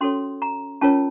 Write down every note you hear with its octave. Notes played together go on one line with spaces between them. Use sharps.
C#4 F#4 A4 C#5 C6
A#5
C#4 F4 A#4 C#5 A5